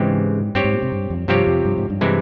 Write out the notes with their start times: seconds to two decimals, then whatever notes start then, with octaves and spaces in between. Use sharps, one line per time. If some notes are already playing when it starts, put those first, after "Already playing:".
Already playing: G#2 C#3 E3 G#3 C4 G4
0.55 G2 C4 G4 C#5
0.64 G#2
0.73 A#2
0.82 C3
0.92 G2
1.10 F2
1.28 G2 C3 F3 C4 G4 C#5
1.47 F2
1.65 G2
1.78 G#2
1.90 G2
2.01 C3 E3 G#3 E4